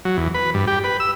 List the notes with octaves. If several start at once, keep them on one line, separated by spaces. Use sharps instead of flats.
F#3
E2
B4
G2
G4
B4
E6